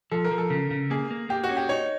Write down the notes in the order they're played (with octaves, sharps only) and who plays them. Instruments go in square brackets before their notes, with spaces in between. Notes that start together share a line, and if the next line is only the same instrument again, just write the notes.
[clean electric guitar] F3 [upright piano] A4
[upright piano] A#4
[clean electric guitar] F3
[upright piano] A4
[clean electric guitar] C#3
C#3
[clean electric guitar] A#3 [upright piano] G#4
[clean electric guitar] A#3
[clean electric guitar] A#3 [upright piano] G4
[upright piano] F#4
[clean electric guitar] C#4
[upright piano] G4
[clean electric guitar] D#4 [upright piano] C#5